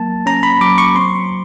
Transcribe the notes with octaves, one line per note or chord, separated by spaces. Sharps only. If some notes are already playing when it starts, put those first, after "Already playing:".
Already playing: F#3 A#3 A5
C#4 A#5
B5
F#3 D6
C#6
C4 C6